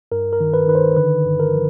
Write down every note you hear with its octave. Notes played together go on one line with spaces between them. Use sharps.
G2 A#4
A#4
D#3
B4
D#3 B4
C5
D3 B4
G2
A#4
F3